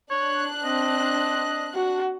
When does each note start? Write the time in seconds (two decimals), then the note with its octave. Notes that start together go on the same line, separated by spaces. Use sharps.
0.11 D4 C#5 F#6
0.65 C4 D#5
1.74 F#4